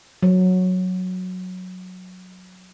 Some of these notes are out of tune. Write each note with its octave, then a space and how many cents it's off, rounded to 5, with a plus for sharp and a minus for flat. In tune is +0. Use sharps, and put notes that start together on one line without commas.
F#3 -10